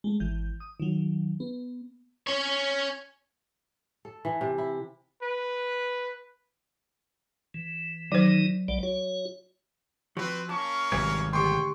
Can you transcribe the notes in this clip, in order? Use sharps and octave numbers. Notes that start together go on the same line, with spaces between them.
G#3 A3
G#1 E3 G6
D#6
D#3 F#3
B3
C#4 C#5
A4
E3
C3
E4
B4
E3
D#3 E3 F#3 D#4 C5
B1 G3 D5
F#4 C#5
F3 C4 F#4 B4
A#3 C#4 A5 C#6
G#1 C3 G3 B4 G5 G#5 G#6
D2 B3 D4 G4 G5 C6 C#6